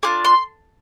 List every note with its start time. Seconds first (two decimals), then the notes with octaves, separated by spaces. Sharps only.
0.03 D4 F4 G#4 D6
0.25 C6